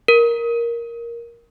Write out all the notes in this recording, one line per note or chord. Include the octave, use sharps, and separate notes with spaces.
A#4